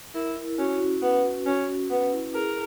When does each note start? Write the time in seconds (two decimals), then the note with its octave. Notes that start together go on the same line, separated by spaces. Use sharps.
0.15 E4 A#4
0.36 E4
0.59 C#4 F#4
0.80 C#4
1.02 B3 B4
1.24 F#4
1.46 C#4 F#4
1.68 C#4
1.90 B3 B4
2.12 E4
2.34 G#4 A#4